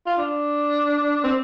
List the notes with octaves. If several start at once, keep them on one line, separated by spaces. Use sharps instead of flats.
F4
D4
C4